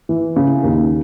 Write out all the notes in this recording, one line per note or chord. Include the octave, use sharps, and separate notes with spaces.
E3
C#3
D#2